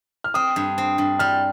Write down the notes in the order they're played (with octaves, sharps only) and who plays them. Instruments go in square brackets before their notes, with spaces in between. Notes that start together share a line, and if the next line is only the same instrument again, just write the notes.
[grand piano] F6
[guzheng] C4 [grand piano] D#6
[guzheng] G2
C4
G2
[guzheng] G3 [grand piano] F6